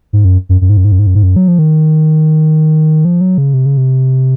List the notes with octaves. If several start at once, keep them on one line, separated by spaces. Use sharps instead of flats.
G#2
F#2
F#2
F#2
G#2
F#2
G#2
F#2
G#2
F#2
G#2
F#2
F#3
F3
D#3
F3
F#3
C#3
C3
C#3
C3